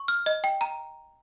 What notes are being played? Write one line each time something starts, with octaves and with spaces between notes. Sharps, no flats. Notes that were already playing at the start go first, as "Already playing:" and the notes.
Already playing: C#6
F6
D#5
G5
A#5